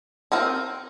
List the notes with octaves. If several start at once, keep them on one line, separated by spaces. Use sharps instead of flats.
C4 D#4 A#4